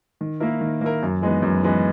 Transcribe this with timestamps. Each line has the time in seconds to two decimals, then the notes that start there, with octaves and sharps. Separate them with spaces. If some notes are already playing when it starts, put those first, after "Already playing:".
0.21 D#3
0.40 A#3 E4 A#4
0.61 D#3
0.81 A#3 E4 A#4
1.03 F#2
1.22 E3 G#3 B3 D#4
1.42 F#2
1.63 E3 G#3 B3 D#4